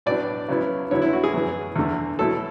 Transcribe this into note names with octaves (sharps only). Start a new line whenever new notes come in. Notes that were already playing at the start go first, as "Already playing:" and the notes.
A2 F#3 B3 D4 D5
C#3 F#3 B3 E4
D3 F#3 B3 E4 C#5
E4
F#4
G#4
F#2 E3 B3
E2 D3 A3
B2 F#3 A3 E4 A4